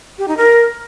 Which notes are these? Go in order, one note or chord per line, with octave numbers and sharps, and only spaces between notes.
G4
D#4
A#4